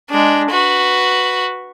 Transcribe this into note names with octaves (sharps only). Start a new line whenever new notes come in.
G#3 D4
F#4 B4